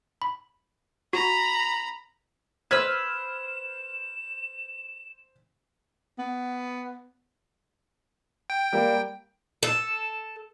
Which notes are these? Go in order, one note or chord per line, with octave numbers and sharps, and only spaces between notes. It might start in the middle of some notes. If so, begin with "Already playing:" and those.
B5
F#4 A#5 B5
B4 C5 E6 F6 G#6 E7
B3
G5
G3 A#3
A4